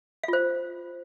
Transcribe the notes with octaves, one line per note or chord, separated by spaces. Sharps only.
F4 C5 F5